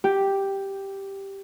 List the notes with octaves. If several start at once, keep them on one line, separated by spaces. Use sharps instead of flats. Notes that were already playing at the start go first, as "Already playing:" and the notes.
G4